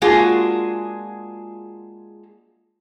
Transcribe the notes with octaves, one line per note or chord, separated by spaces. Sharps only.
G#3 A#3 D4 F4 F#4 G#4